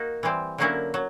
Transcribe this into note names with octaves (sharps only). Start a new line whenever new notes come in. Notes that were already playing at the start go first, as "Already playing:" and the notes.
Already playing: A#3 D#4 F#4
E3 G3 C4
D3 F#3 A#3 C#4 E4
F#3